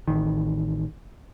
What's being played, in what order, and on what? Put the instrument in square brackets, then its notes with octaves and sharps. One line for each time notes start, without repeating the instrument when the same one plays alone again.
[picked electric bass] A1 D#3